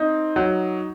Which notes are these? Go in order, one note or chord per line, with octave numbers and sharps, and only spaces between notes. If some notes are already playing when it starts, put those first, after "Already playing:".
Already playing: C4 D#4
F#3